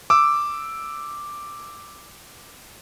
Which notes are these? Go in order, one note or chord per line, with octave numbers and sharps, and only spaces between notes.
D6 E6